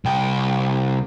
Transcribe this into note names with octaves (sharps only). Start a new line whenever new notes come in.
C2 G5